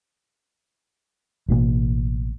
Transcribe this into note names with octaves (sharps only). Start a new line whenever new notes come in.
A1 B2 A#3